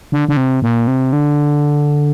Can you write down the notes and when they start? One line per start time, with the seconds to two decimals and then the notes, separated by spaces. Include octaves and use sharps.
0.12 D3
0.28 D3
0.37 C3
0.62 A#2
0.87 C3
1.13 D3